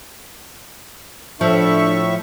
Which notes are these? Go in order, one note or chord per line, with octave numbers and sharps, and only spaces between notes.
A2 F3 D4 A4 E5 C#6